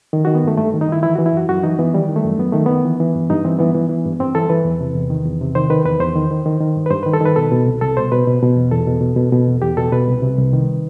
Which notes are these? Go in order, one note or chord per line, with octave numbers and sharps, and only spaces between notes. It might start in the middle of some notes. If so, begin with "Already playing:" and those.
D#3
D#3 F#4
B3
G2 A3
G2 A3
D#3
D#4
D#3 E4
E3 E4
E3 F#4
E4
F#2 F#4
F#2 F#4
E3 D#4
E3 B3
D#3 G3
D#3
A3
F#2
F#2 B3
D#3 A3
D#3 B3
E3
E3
G2
G2 D#4
E3 C4
E3 B3
E3
E3
G2
G2 C4
E3 A4
E3 B4
E2
C3
E2
D#3
E2
C3
D#3 C5
D#3 B4
E2 B4
E2 C5
D#3
D#3
D#3
D#3
G2
B4
G2 C5
D#3 B4
A4
D#3 B4
B2 A4
B2
C2
C2 A4
B2 C5
B2 B4
B2
B2
E2
E2 A4
B2
B2
B2
B2
E2
E2 G4
B2 A4
B2 B4
C2
C3
C2
D#3